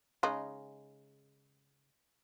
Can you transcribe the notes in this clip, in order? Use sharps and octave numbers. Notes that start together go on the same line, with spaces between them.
C#3 G#3 D#4